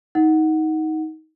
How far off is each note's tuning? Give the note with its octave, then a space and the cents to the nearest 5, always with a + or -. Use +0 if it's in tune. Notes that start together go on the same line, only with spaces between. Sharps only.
D#4 +20 F#5 +0